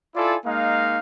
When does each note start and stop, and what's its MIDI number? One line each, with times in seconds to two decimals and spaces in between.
0.16 0.36 64
0.16 0.36 65
0.16 0.36 69
0.16 0.36 74
0.16 0.36 80
0.46 0.98 56
0.46 0.98 58
0.46 0.98 63
0.46 0.98 77